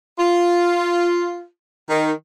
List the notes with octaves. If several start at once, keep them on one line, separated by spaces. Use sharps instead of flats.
F4
D#3